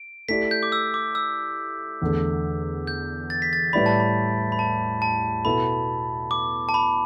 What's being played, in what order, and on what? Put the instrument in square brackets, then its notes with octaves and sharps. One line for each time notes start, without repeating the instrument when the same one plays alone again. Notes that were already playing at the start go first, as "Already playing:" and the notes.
Already playing: [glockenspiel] D7
[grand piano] A3 E4 G4 D5 [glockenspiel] B6
[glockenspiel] G6
D6
E6
D6
E6
[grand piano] E2 D3 A3
[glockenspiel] G6
A6
B6
A6
[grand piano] A2 G3 E4 B4 D5 [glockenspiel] B5
[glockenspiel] A5
B5
B5
A5
A5
[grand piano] B2 B3 E4 A4 [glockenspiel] B5
[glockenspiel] D6
A5
B5